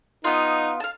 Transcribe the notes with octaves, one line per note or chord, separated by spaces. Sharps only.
B3 D#4 F4
F5 A5